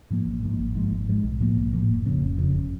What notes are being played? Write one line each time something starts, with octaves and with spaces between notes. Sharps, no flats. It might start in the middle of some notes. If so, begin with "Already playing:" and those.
G#2 F3 A#3
A1
G#2 F3 A#3
G#1
G#2 F3 G#3
G#1
G#2 F3 G#3
B1
A2 F3 A#3
B1
A2 F3 A#3
F1
F2 C#3
F1
F2 C#3
G1